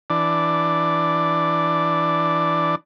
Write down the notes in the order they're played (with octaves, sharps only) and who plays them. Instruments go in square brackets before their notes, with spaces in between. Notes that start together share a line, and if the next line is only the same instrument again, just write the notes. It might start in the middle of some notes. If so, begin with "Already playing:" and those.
[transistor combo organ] E3 D4 D5